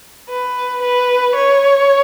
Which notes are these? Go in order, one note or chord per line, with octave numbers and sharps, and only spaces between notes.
B4
B4
C#5